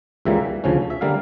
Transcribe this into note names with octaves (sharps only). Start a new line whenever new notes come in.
C#2 C#3 E3 G3 A#3 E5
D2 C#3 F3 C#4
E5
D3 G3 A#3 F5